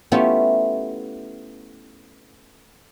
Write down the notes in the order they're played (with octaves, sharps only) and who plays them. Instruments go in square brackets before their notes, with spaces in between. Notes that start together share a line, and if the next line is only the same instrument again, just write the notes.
[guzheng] A3 B3 C#4 E4 F4 G4